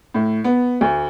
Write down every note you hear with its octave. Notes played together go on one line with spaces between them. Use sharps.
A2
B3
D2